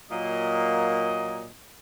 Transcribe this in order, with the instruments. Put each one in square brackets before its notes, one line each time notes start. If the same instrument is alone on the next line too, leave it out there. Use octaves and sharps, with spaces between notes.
[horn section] A#2 F#3 A#3 D#5